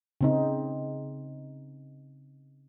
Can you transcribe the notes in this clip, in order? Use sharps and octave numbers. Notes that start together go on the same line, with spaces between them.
C#3 C4 D#4